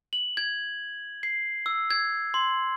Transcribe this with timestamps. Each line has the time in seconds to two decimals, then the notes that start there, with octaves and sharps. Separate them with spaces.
0.13 F#7
0.37 G#6
1.23 C7
1.66 E6
1.90 G#6
2.34 C6